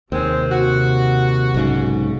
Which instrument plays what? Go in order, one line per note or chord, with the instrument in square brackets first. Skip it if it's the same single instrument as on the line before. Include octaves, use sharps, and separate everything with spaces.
[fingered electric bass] D#2 [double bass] C3 [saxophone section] G#3 C4
[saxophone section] F#4
[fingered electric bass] B1 G#2 C#3